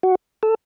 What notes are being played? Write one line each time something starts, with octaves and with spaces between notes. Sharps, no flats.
F#4
A4